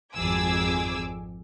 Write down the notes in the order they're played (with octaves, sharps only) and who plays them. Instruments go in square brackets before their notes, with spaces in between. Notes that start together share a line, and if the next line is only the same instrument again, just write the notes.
[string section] G#1 F2 G#4 D6 E6 G#6